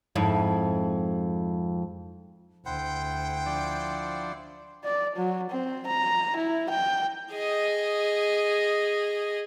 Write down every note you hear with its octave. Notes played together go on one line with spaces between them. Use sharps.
F2 G#2 E4
D2 E4 C5 F#5 G5
F3 D4 D5
D5
F#3
C4
A#5
E4
G5
G#4 D#5